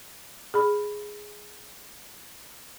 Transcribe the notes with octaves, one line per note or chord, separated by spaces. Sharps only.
G#4 B5